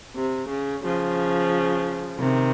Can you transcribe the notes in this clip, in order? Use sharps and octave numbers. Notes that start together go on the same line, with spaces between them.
C3
C#3
C#3 F3
C3 D#3